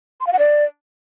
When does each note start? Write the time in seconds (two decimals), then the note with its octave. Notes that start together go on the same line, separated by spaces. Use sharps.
0.21 C6
0.27 F5
0.33 F#5
0.39 D5